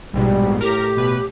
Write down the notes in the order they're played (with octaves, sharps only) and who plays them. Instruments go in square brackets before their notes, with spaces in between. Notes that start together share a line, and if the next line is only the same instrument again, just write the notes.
[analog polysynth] A#1 G#2 B2 [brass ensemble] G3
[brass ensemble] A2 [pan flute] G4 [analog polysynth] A#4 A#5
[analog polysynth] B2 B4